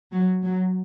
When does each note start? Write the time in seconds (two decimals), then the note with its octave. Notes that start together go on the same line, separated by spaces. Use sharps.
0.13 F#3
0.44 F#3